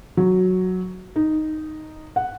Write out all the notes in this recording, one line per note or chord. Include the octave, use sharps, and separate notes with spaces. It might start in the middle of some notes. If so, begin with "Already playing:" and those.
F#3
D#4
F#5